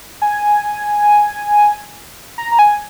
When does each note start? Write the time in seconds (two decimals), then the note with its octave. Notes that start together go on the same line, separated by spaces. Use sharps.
0.22 G#5
2.38 A#5
2.52 A#5
2.59 G#5